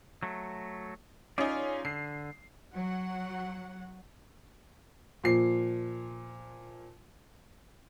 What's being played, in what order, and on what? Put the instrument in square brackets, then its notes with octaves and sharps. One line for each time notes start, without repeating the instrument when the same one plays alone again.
[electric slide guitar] F#3 A3
[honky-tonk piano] C#4 D#4 [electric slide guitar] F4 G#4 D5
[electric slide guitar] D3 [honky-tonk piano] C7
[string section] F#3 F#5
[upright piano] A#2 F3 C7